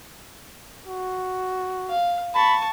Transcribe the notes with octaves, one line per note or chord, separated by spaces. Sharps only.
F#4
F5
A5 B5 C#6